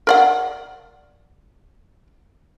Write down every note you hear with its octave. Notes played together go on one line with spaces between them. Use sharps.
A#4 D5 F#5